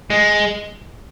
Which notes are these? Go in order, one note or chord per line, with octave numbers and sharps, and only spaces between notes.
G#3